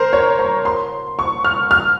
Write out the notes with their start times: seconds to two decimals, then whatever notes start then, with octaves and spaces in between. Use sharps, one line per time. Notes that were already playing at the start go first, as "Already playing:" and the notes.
Already playing: A#4 C5
0.13 C#5
0.39 A#5
0.65 C6
1.19 C#6
1.44 F6
1.71 F6